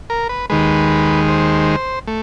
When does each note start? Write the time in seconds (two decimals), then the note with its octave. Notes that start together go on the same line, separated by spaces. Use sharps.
0.10 A#4
0.29 B4
0.50 D#2 D#3 G#3 B4
1.28 C5
2.07 A3